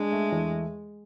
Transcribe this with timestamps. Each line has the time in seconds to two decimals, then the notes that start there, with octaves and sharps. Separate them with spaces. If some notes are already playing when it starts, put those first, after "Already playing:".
Already playing: G#3 D4
0.12 A3
0.32 E2